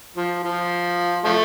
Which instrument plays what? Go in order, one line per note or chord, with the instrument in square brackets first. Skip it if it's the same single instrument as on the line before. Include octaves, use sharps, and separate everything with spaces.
[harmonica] F3
F3
F3 A3